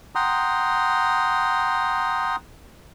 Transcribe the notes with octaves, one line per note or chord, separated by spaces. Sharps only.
F#5 G5 A#5 C6 D#6